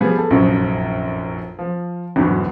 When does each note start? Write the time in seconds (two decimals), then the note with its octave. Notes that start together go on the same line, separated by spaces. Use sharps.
0.01 F3 G3 B3 G#4
0.18 A4
0.30 F1 A#1 F#2 F3 F#3 C#4
1.59 F3
2.16 G#1 E2 G2 D3 F#3